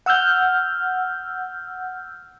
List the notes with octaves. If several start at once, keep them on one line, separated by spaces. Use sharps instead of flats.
F#5 E6 F6 G6